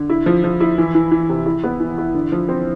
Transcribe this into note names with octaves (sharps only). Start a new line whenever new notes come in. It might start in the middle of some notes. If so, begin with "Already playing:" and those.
Already playing: D3
E4
F3
F3
E4
E3
E3
E3
C3
E4
B3
E3
E4
D3
F3
C4